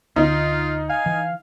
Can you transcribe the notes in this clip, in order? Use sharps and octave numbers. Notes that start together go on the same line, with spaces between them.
D2 D#4 F4
F5 G#5
E3